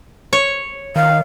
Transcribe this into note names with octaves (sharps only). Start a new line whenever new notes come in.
C#5
D#3 F5